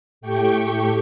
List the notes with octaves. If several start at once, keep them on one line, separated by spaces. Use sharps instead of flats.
A2 A3 G4 G5 C#6